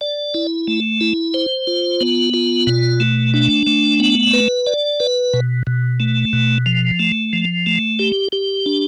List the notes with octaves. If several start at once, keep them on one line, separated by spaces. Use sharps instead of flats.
D5
E4
A3
E4
C5
F4
B3
F4
B2
A3
D4
A3
B3
B4
D5
B4
B2
B2
A3
B2
F3
A3
F3
A3
G4
G4
D4